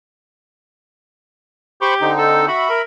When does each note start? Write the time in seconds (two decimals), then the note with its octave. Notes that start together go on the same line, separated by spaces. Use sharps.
1.82 G4 C5 B5 C#6
2.01 D3 C4 D#4
2.18 A4
2.48 F#4 E5 B5
2.70 A#4